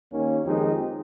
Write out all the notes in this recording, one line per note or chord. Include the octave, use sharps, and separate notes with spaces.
D#2 D#3 A#3 C#4
F2 D#3 G#3 D#4 G4